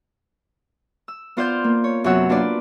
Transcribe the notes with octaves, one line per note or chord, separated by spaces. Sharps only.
E6
B3 F4 C5 D5 F5 G6
A#3
C#5
F#2 C3 B3 C#5 F#5 E6
A#3 D4 F4 B4 D5